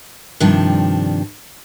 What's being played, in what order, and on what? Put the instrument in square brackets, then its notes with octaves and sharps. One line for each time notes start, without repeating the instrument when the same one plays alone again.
[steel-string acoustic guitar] G2 C3 D#3 F3 D4